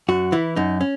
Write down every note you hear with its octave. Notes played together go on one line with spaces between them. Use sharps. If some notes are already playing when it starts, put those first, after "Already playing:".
F#2 F#4
E3 E4
F#2 D#4
C#4